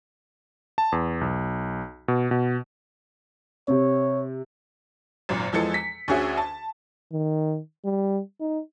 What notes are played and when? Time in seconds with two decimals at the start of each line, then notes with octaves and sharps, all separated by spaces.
0.78 A5
0.92 E2
1.21 B1
2.08 B2
2.31 B2
3.68 C3 C4 C#5
5.29 G#1 F#2 A#2
5.52 E2 E3 F3 G#3 A4 C#7
5.74 B6
6.08 D2 C#4 F#4 G#4 E5
6.38 A5
7.12 D#3
7.85 G3
8.40 D#4